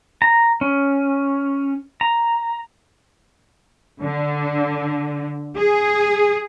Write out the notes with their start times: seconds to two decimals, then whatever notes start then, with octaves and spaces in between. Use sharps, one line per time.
0.22 A#5
0.61 C#4
2.01 A#5
4.02 D3
5.57 G#4